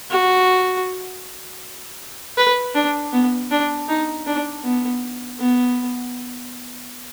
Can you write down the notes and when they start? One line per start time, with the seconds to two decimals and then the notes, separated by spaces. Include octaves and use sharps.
0.11 F#4
2.38 B4
2.75 D4
3.13 B3
3.51 D4
3.89 D#4
4.27 D4
4.64 B3
5.40 B3